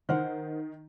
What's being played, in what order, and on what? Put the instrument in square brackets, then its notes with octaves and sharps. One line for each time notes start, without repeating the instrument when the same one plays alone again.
[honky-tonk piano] D#3 [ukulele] A#4 C5 F#5